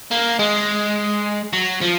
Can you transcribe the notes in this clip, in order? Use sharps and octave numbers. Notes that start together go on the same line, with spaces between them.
A#3
G#3
F#3
F3